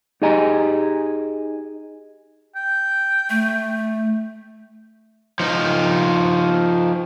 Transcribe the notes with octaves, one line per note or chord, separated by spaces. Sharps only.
D#4 G4 G#4 D#5 G#5 A#5
G5
A3
F3 D#4